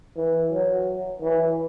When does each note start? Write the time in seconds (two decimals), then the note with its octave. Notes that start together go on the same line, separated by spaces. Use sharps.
0.17 E3
0.52 F#3
1.22 E3